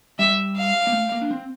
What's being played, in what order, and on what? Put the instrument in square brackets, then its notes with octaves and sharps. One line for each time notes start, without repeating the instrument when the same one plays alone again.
[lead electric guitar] G3 [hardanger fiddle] E5
[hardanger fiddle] F5
[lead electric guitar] A#3
A3
A#3
D4
C4